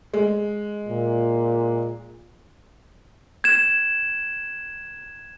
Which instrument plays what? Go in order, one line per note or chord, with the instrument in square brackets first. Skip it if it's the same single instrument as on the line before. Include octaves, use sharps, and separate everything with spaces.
[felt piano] G#3
[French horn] A#2
[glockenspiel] G#6 E7